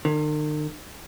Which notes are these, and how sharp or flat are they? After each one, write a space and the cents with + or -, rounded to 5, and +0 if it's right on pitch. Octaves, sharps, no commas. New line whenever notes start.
D#3 -45